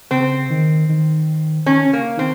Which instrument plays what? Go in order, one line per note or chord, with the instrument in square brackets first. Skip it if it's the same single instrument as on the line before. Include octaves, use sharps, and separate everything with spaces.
[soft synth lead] C#3 [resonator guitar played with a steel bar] C4
[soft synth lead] D#3
D#3
[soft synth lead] D#3 [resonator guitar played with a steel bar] C#4
[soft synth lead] C#3
[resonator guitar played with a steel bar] A#3
[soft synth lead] D#3 [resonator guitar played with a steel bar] C4